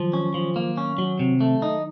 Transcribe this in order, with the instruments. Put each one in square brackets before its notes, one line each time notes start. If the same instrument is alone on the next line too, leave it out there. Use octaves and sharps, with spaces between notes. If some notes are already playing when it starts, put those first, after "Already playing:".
Already playing: [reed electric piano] D#3 F#3 [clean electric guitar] F3
[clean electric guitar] C#4
F3
A#3
C#4
F#3
C3
A3
D#4